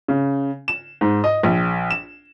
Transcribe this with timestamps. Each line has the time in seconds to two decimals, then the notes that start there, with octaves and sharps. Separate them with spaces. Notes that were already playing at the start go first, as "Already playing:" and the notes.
0.08 C#3
0.68 E7
1.01 G#2
1.24 D#5
1.43 A#1
1.91 E7